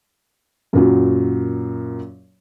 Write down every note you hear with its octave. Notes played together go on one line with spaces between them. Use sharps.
F#2 A#2 F#3